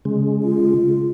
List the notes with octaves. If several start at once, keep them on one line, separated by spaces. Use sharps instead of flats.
C#3 G#3
F4